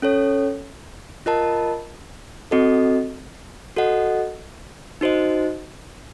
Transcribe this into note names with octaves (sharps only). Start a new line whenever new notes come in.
C#4 A4 C#5
F4 A#4 D#5 A5
C4 F#4 A4 D#5
F#4 A4 D#5 F#5
D#4 F#4 C5 D#5